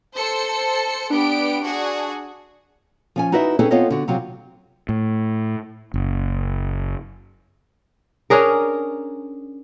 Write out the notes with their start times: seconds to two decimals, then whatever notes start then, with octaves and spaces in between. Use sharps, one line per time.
0.15 A4 C5 C#7
0.49 A5
1.10 B3 D4 G4 D7
1.62 F#4 G#4
3.16 F3 C#4 G#5
3.32 D#4 E4 F#4 B4 D#5 E5
3.59 C4 C#4 D#4 G#4 A4 B4
3.71 B3 C4 F4 A4 C#5 D#5
3.91 D3 F#4
4.08 C3 F#3 C4 F4
4.89 A2
5.94 F#1
8.30 C#4 D4 G#4 A#4